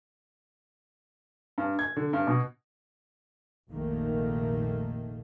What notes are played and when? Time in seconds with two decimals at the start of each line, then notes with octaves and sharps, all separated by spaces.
1.58 G2
1.79 G#6
1.97 D3
2.13 G2
2.27 B2
3.71 F1 A#1 D#3 A3 A#3